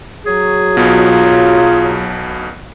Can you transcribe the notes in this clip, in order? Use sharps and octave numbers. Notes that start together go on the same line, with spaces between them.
F#3 F#4 G#4
B1 B2 F4